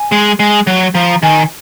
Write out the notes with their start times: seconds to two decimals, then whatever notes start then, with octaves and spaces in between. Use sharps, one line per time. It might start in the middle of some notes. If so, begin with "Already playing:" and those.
Already playing: G#5
0.12 G#3
0.40 G#3
0.67 F#3
0.95 F3 A#5
1.23 D#3 G#5